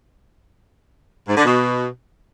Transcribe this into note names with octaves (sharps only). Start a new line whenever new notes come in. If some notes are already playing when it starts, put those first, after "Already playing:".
G#2
D3
B2